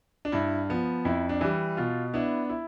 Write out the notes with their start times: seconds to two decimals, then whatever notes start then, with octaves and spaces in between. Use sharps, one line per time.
0.25 D4
0.32 G2 E4
0.70 F3 B3
1.05 F2 E4
1.29 D4
1.41 E3 G3
1.77 B2 F4
2.14 B3 D4 E4
2.50 E4